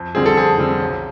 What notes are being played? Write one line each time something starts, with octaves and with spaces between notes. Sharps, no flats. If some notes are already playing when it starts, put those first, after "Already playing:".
Already playing: F2
D3 G3 C4 G#4
A4
F2 G#4
D3 G3 C4
B1